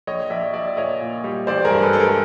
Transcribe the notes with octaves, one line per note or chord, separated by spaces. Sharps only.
A#1 C#5 D#5
A#1 D5 E5
A#1 D5 E5
A#2 C#5 D#5
A#2
G3
A1 C5 D5
G#4 A#4
G2
A4 B4
G#3 A4
G#4 A#4